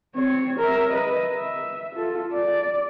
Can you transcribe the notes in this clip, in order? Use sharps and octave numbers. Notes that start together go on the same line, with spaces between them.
C4 C#5
A#4 E5
B4 D#5
E5
F4 A4
D5